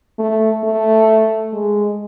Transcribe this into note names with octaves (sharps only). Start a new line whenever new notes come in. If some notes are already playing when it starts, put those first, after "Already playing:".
A3
A3
G#3